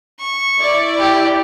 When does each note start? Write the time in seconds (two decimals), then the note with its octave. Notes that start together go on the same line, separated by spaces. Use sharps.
0.19 C#6
0.60 E4 D5
0.99 G4